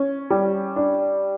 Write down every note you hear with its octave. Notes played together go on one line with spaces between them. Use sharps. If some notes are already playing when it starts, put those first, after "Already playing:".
Already playing: C#4
G3
D4